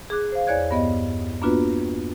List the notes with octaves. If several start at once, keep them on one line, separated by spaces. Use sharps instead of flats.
G#4 D6 F#6
C5 F5
E2 C#5 D5 F#6 G#6
G2 B3 D#5
A#3 B3 D4 F4 F#4 B4